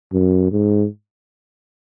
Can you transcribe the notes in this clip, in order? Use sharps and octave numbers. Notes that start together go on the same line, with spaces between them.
F#2
G#2